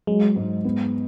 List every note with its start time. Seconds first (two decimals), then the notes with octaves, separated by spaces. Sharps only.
0.07 F#3 G#3
0.36 G#2
0.65 B3